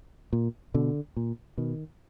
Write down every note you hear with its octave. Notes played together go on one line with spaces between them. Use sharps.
A#2
B2 D3
A#2
B2 D#3